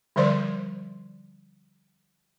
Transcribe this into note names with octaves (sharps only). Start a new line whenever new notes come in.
D3 F3 G3 C5 D5 C6